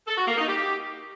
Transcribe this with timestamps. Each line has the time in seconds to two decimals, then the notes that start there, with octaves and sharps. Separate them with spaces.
0.07 A4
0.17 F#4
0.28 A#3
0.38 D#4
0.48 G4